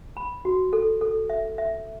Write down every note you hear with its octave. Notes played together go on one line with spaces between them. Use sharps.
B5
F#4
A4
A4
E5
E5